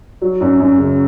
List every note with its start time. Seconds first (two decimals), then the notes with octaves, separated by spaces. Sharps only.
0.22 F#3
0.41 F#2
0.59 F#2
0.78 C#3